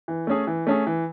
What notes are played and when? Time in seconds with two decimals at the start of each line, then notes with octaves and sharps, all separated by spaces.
0.08 E3
0.27 A3 C#4 G#4
0.47 E3
0.67 A3 C#4 G#4
0.87 E3